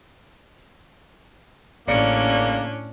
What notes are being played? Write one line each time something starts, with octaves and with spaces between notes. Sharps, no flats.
A1 A2 C#3 A#3 C#4 D4 D5 C#7